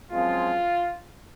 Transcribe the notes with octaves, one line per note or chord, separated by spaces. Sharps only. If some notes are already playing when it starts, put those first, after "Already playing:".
F#2 F3 G#3 C4 F4